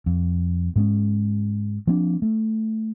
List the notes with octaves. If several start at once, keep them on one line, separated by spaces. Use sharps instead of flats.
F2
G#2 G#3 C#4
F3 A#3 C4 D4
A3